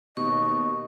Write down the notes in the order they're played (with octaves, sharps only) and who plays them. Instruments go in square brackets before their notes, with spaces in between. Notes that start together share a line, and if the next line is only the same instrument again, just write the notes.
[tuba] D#2 [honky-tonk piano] B2 [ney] D#5 [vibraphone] C#6